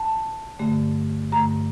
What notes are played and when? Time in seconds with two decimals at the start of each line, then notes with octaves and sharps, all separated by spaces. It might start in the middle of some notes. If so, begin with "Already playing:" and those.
Already playing: A5
0.59 G2 D3 A3
1.32 G2 D3 A3 A#5